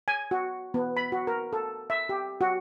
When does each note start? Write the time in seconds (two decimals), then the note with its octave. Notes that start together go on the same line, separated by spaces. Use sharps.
0.08 G#5
0.31 F#4
0.74 B3
0.97 B5
1.12 F#4
1.27 A#4
1.53 A4
1.90 E5
2.09 G4
2.41 F#4